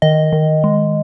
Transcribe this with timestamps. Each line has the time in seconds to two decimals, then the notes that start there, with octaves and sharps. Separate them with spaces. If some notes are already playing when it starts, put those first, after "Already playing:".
0.02 D#3 D#5
0.33 D#3
0.64 G#3